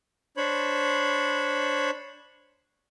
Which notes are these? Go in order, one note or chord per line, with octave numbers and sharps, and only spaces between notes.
D4 C5 C#5 B5